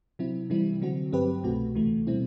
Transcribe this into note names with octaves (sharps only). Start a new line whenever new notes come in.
C3 F#3 C4 E4
C3 E3 G3 C4 E4
D3 F#3 C4 F#4
G2 F#3 C4 G4 B4
C2 B2 A3 C4 F#4
D2 C3 E3 A3
B2 G3 C4 E4